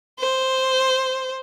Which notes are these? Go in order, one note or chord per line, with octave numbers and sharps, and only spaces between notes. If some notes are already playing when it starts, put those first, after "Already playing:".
C5